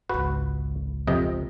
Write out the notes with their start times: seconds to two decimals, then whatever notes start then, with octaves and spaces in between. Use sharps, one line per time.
0.09 G#1 C#2 F#4 B4
1.07 F2 C3 D#5